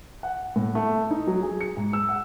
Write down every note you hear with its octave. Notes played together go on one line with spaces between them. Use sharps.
F#5
A2
A3
D#4
F#3
G#4
C#7
G#2
E6
F#5